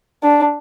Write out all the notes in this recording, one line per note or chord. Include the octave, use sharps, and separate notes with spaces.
D4